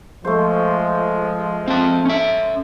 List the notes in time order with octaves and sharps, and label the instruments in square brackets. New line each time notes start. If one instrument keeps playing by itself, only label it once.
[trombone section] F3 G#3 [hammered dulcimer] A3 C5
[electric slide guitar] C4 A5
C#4 E5